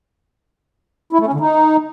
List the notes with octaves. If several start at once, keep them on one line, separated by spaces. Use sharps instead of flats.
E4
A3
C#4
D3
D#4